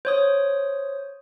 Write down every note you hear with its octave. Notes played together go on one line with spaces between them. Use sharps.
C5 C#5 D#6